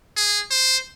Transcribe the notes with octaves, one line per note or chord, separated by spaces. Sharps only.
G#4
C5